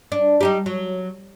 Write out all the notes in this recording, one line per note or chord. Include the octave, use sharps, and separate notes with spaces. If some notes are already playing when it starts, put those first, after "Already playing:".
D4
G3 D#4 G4
F#3